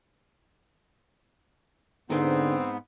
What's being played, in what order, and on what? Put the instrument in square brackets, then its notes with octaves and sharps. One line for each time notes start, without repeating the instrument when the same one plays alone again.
[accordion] G#2 B3 [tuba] D3 [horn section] C4 [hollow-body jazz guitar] D#4 G#4 G5